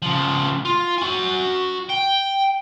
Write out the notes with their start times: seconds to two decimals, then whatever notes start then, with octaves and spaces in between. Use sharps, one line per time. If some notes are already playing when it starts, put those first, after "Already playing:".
0.02 C#3 F3
0.65 F4
0.98 F#4 G#5
1.90 G5